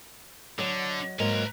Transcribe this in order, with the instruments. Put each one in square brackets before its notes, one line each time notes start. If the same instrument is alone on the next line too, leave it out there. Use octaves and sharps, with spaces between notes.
[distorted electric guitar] D3 [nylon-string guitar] F#3 D#5
[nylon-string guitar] G#2 F#3 A#3 [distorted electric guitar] B4 A#5